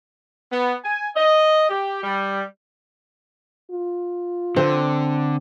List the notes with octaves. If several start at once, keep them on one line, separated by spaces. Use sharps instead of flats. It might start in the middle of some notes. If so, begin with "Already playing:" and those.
B3
G#5
D#5
G4
G3
F4
D3 C4